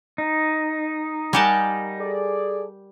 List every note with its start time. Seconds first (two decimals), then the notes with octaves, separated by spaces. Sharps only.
0.18 D#4
1.33 G3 G4 A#4 F#5 G#5 A5
1.99 G#4 A4 D5